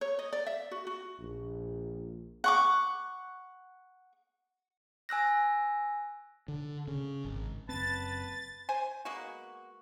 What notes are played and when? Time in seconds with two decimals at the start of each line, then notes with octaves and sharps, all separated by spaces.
0.01 C#5
0.19 D#5
0.33 D5
0.47 E5
0.71 F#4
0.87 F#4
1.19 A#1
2.44 F#5 C#6 D6
5.09 G#5 E6 F#6 A#6
6.48 D3
6.88 C#3
7.25 G#1
7.69 F#1 F#2 C4 B4 A5 A6
8.69 C5 G#5
9.05 G#3 A#3 B3 F#4